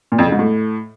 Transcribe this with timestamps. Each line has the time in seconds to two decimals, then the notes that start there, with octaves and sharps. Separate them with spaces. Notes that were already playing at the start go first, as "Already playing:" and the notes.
0.12 A#2
0.18 F2
0.25 C#3
0.32 G#2
0.39 A2